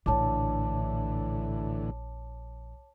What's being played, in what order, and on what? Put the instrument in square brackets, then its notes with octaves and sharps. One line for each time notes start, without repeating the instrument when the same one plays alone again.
[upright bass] A#1 D4 [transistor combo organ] A2 D3 E3 [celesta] C#5 A5 D6